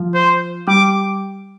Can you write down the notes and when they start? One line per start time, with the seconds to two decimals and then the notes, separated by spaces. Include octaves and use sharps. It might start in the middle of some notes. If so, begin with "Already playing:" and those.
Already playing: F3
0.15 C5
0.68 G3 D6